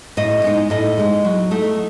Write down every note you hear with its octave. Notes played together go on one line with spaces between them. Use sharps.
A2 D#5
G#3 D#4
A2 D#5
G#3 D#4
F#3
A3 D#4